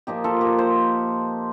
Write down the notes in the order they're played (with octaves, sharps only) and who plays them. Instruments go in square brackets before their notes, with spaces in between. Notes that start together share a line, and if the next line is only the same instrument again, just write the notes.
[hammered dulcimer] A#2 F3 A#3 D#4 G4
F4 A4
G4 A#4
A4 C5